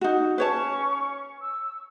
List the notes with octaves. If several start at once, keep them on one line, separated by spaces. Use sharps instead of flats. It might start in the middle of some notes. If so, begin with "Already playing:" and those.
D#4 F#4
C#4 B4 C#5 A5 C#6
E6